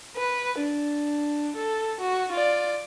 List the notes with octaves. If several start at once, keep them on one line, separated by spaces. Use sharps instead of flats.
B4
D4
A4
F#4
F4 D5